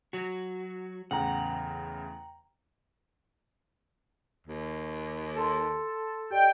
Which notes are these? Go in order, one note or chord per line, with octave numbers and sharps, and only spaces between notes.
F#3 F#4
E2 A2 C#3 F#5 G5 A#5
D#2
A4 A5 C6
G4 D5 D#5 G5